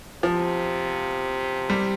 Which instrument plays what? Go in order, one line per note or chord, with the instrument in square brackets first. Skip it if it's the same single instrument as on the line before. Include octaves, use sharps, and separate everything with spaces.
[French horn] C3 [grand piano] F3
[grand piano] G3